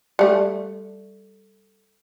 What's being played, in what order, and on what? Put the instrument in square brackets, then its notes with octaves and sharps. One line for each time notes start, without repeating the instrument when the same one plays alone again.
[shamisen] G3 A3